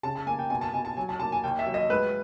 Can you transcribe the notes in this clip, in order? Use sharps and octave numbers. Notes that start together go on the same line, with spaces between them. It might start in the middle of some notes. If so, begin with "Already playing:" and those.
C#3 A5
A5
A#3 G#5
G5
B2 G#5
A5
B2 G#5
A5
F#3 G#5
A5
A#3 A5
G#5
D#2 G5
E5
F#3
D#5
G#2 B4